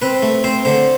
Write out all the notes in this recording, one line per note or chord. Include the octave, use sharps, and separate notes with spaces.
C4 B4
A3
C4 C5
D3 C5